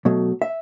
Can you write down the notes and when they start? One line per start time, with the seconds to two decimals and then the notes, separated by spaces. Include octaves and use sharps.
0.05 B2 F#3 A3
0.42 E5